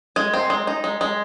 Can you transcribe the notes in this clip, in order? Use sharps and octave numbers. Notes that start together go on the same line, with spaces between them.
G#3 G#5
C4
G#3
D#4
G#3
G#3